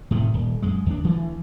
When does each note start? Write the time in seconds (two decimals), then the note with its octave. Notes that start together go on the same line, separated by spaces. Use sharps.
0.11 A2 C3 D#3
0.34 D#1
0.62 F#2 G#3
0.86 D#2 D4
1.04 D2 E3